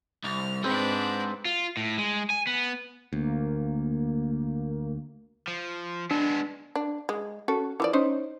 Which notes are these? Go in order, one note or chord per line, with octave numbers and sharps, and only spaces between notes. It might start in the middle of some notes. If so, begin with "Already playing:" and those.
C2 F6
G#2 G#3 C4 D4 B4
F4
A2
G#3
G#5
B3
D2 A#3
F3
G#3 B3 D4
D4
G#3
C#4 F#4 A4
E3 F3 D5
C#4 D#4 C5